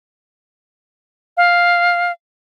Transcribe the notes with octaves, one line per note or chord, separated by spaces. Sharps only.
F5